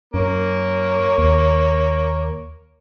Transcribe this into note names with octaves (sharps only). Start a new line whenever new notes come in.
F#2 A#3 C#5
D#2